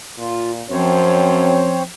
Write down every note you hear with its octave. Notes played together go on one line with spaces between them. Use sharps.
A#2 F4
F#2 F3 C4 C5 C#5